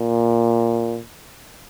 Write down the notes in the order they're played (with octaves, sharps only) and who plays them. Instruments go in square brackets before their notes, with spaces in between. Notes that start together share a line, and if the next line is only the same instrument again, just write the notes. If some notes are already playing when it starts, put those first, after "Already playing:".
Already playing: [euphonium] A#2